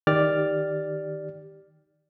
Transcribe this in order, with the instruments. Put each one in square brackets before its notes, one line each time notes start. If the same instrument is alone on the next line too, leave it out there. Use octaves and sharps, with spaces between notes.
[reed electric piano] D#3 G4 D5 F6 A6